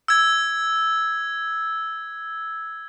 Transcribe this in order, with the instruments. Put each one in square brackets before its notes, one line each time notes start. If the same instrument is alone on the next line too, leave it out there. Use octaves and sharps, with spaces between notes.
[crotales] E6 G#6